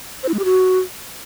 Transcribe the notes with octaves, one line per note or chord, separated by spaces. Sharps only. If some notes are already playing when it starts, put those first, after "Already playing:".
C5
E4
G#3
G4
F#4